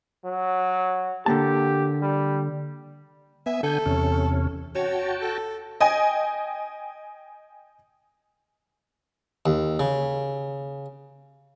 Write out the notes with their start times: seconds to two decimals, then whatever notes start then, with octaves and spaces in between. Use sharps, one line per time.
0.25 F#3
1.26 D3 A#3 G4 A5
2.02 G3
3.46 B3 E5 G#5
3.63 D3 A4 G#5 G6
3.86 E2 C3 C#4
4.75 F#4 C#5 G5 A5
5.22 A4
5.80 D#5 G5 G#5
9.46 D#2
9.80 C#3